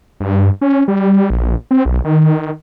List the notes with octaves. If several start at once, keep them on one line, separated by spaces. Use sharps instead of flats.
G2
C#4
G3
A#1
C4
B1
D#3